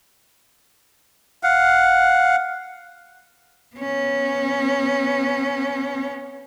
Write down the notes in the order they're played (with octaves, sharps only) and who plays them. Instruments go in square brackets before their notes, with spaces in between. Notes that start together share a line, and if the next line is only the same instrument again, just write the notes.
[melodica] F5 F#5
[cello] B3 C#4